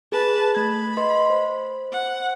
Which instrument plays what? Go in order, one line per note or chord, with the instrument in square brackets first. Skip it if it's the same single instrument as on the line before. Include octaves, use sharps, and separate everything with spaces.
[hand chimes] G#4 [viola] B4 A5
[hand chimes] A3 G#6 [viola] B5
[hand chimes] B4 D#5 C6
C5
[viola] F#5